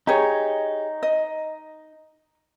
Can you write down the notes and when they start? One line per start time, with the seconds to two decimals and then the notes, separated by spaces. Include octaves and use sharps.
0.07 D#4 G4 G#4 C#5
1.03 D#5